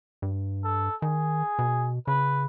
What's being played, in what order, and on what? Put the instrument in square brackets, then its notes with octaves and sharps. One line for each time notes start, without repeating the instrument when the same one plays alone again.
[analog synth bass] G2
[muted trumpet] A4
[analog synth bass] D#3 [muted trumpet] G#4
[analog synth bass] B2
[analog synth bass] C#3 [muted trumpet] B4